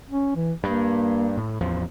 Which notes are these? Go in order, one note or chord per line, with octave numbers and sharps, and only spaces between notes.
C#4
E3
G2 A#3
A2
A1 E2 F3